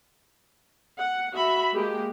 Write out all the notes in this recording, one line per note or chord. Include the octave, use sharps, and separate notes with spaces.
F#5
F#4 E5 B5
G#3 A#3 G4